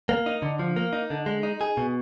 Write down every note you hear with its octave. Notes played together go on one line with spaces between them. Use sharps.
A#3
D#4
D3
F3
A#3
D#4
D3
G#3
D#4
G#4
B2